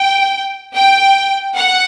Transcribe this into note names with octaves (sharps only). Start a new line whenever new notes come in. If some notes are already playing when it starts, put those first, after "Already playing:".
Already playing: G5
G5
F#5